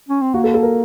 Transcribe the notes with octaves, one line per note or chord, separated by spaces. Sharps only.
C#4
C4
A#3 F#4
A4
A4
A#4